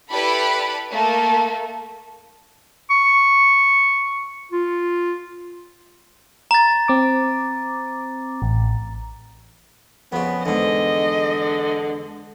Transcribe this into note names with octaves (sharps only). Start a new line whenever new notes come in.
E4 G4 A4 B4 D5 B5
A3 A#3 A4
C#6
F4
A#5 A6
C4 D6
A1
F2 C#3 B3
E2 G#2 D3 D#5